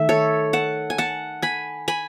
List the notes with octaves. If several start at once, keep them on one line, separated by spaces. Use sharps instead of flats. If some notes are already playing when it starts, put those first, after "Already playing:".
Already playing: D#3 A3 E5
A4 C#5
F#5 A5
G#5
F#5 A5
G#5 B5
G#5 B5